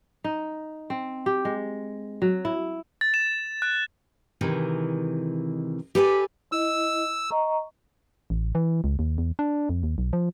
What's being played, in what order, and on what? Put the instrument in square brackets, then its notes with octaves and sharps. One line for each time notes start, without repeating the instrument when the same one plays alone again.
[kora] D#4
C4
G4
G#3
F#3
E4
[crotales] A6
E7
F#6
[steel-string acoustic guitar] C3 D#3 E3 G#3
G4 A4 B4 D5 F5 G#5
[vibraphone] E4 D#5 [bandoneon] E6
[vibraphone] D#5 A#5 C#6
[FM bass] A1
E3
C#2
D#2
E2
D4
F2
D#2
B1
F3